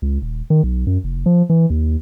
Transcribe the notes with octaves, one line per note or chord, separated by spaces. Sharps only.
C#2
D#1
D#3
B1
F#2
F1
F3
E3
D#2